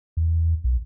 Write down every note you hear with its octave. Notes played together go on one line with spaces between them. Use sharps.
E2
B1